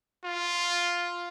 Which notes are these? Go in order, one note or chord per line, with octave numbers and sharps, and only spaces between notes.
F4